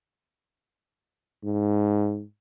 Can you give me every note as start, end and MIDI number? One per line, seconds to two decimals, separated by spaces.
1.44 2.23 44